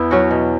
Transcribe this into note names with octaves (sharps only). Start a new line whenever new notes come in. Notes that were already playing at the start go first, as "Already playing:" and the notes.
Already playing: E2 E3 B3 E4
F#3 C#4 F#4
B2